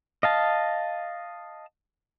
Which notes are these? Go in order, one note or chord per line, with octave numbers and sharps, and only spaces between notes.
D#5 F5 A5